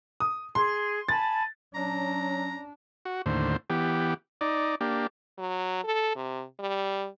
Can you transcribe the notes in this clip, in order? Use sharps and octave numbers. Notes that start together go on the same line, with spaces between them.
D#6
G#4 C6
G#5 A5 B5 A6
F#3 C#4 D4 A#5
F#4
D#2 A2 D3 C5
E3 B3 G4
D#4 D5
A#3 D4 G4
F#3
A4
C3
G3